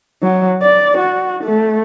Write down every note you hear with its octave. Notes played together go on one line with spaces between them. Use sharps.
F#3
D5
F#4
A3